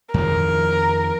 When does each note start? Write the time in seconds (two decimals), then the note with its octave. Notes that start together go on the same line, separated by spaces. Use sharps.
0.14 F2 D#3 F3 A#4